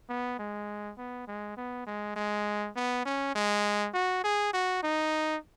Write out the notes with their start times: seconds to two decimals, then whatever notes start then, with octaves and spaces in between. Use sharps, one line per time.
0.09 B3
0.39 G#3
0.98 B3
1.27 G#3
1.57 B3
1.87 G#3
2.16 G#3
2.76 B3
3.05 C#4
3.35 G#3
3.94 F#4
4.24 G#4
4.53 F#4
4.83 D#4